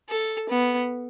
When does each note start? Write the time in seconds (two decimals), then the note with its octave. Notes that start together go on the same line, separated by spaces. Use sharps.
0.09 A4
0.50 B3